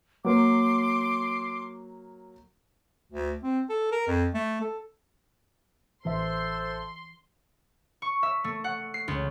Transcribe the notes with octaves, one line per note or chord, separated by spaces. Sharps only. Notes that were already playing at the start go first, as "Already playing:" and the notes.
F#3 A#3 C6 D6
D2
C4
A4
A#4
F2
A3
A4
A1 E3 A4 C5 E5 C6
C#6
E5
A3
F#5
C7
C#2